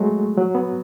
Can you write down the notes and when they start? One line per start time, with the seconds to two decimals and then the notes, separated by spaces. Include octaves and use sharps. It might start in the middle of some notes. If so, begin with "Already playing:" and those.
Already playing: F#3 G#3 A3
0.37 F#3
0.55 B3